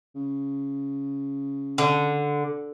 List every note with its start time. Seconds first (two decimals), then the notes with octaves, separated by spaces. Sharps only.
0.15 C#3
1.78 D3